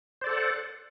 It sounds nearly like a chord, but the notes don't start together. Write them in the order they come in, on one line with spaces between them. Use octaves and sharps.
C5 D5 A4 F#5